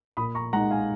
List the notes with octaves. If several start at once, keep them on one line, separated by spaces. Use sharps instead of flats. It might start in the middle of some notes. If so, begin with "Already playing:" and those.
A#2 B5 D#6
A#5 C#6
G#3 D#4 F#5 A#5
F5 G#5